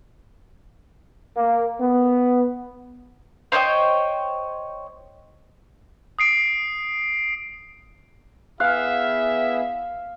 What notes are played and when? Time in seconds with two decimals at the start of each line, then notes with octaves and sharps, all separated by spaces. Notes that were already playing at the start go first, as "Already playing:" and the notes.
1.36 A#3
1.79 B3
3.52 C5 C#5 D#5 G5
6.19 D#6 C7 D7
8.60 B3 E4 G#4 E5 F5 F6 F#6